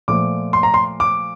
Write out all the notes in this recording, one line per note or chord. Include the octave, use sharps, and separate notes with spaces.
A#2 F3 A3 D6
C6
A#5
C6
D6